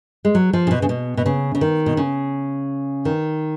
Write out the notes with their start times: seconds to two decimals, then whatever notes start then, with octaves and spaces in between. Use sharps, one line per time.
0.25 G#3
0.35 F#3
0.53 F3
0.67 C#3
0.71 B2
0.82 C#3
0.89 B2
1.17 B2
1.26 C#3
1.55 C#3
1.61 D#3
1.86 B2
1.97 C#3
3.05 D#3